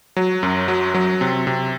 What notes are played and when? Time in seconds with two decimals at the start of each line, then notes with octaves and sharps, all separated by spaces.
0.16 F#3
0.43 F#2
0.68 F#3
0.94 F#3
1.21 C3
1.47 C3